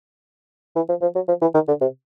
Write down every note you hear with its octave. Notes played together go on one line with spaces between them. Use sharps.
E3
F3
F3
F#3
F3
E3
D#3
D3
C3